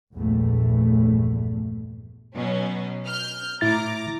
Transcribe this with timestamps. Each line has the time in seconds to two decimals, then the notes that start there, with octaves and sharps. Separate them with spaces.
0.13 A#1 E2 G2 A#2 A3
2.36 B2 F#3 C#4
3.07 F6 G6
3.61 A2 E4 A#5 D6 A6